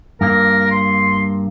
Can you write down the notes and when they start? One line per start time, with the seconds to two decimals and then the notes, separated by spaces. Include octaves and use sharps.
0.21 G2 A#3 A#4
0.71 C6